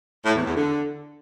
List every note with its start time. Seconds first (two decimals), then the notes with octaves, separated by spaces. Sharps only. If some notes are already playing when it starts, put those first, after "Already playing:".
0.25 A2
0.35 E2
0.45 E2
0.55 D3